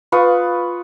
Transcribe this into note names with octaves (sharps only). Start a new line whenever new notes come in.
F4 B4 C#6 D#6